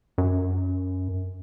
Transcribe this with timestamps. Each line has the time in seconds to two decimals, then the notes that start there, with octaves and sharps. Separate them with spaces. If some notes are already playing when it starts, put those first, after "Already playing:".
0.18 F#2